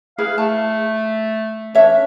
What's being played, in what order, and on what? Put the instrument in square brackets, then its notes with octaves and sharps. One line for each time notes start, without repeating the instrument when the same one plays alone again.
[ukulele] E4 G#4 B4 [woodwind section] F5
[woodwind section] A3 [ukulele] A5
[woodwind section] E3 C#4 D4 [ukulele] C#5 E5